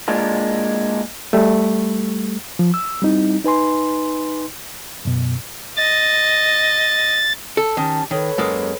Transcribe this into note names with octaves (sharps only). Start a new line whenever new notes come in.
A#2 G#3 D4 F4
G3 A3
F3
E6
G3 C4 D#4 E4
D#4 B4 G#5 C6
F#2 B2
D#5 A6
A4
D#3 C#4 G4 A5
D#3 A4 B4 C#5
F#2 G#3 A#3